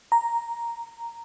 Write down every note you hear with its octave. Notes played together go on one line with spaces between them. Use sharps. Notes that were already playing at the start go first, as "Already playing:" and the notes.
A#5